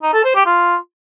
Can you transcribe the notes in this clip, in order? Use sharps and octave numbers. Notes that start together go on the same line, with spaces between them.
D#4
A4
C5
G4
F4